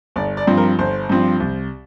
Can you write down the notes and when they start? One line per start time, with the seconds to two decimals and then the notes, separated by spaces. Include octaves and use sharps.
0.16 G1 D5
0.37 D5
0.47 G2 F3 C4
0.58 A#4
0.78 G1 C5
1.10 G2 F3 C4
1.40 C2